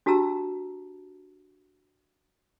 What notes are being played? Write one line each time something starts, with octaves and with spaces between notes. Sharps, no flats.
D4 F#4 G4 A5 A#5 E6